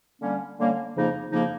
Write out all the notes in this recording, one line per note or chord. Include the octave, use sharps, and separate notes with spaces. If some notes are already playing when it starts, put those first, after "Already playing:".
D3 G3 A#3 C#4
D3 G3 A#3 C#4
F2 C#3 F3 A#3 D#4
F2 C#3 F3 A#3 D#4